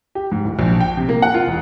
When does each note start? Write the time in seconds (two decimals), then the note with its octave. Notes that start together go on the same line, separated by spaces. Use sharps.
0.15 G4
0.32 G#2
0.44 D1
0.59 A#1
0.80 G5
0.97 C3
1.09 A#3
1.22 F#5
1.34 F4
1.47 E1